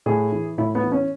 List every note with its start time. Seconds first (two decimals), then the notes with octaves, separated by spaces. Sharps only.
0.06 A2 G#4
0.32 E3
0.58 A2 E4
0.75 B3
0.83 E3
0.92 C#4